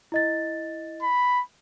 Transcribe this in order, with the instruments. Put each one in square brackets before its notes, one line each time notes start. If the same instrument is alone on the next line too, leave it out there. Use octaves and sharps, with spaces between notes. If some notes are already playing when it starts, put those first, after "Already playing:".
[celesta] E4 D#5 A6
[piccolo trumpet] B5